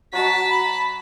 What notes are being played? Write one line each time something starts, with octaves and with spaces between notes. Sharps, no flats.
F#3 F#4 D#5 A5 B6
B5